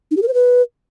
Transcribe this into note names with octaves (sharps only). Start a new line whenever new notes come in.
D#4
G4
A#4
C5
B4